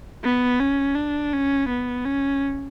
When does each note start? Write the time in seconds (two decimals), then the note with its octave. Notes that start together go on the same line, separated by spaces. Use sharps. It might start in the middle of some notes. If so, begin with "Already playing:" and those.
0.24 B3
0.60 C#4
0.96 D4
1.33 C#4
1.69 B3
2.05 C#4